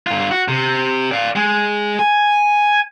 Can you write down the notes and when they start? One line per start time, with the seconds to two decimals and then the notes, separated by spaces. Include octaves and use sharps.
0.07 G2 F4
0.31 F#4
0.48 C3
1.11 D5 F5
1.36 G#3
1.99 G#5